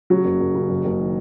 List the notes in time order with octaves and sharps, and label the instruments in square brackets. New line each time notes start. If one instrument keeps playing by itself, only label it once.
[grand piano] C#3 F#3
F#1
F#1
C#3
F#1
F#1
D#3